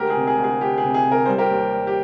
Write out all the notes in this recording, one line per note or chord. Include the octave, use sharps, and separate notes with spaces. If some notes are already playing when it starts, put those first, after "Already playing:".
Already playing: D2 G#3 G4 A#4
G#4
C3
G#4
D2
G#4
D2 G4
G#4
C3
G#4
C3
A#4
G3 C5
G4 A#4
D#2
G3
G4